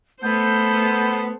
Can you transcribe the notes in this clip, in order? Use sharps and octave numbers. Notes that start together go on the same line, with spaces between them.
A3 B3 A4 C5 G6